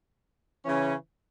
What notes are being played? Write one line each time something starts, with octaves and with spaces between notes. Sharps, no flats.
C#3 E3 C#4